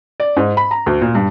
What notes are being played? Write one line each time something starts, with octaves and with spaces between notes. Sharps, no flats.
D5
G#2
B5
A#5
D2
A#2
G2